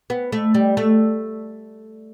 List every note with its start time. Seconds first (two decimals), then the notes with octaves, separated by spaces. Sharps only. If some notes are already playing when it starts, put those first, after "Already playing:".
0.10 B3
0.32 A3
0.54 G3
0.77 A3